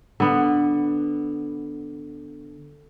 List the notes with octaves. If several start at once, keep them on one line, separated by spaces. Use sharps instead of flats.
D3 B3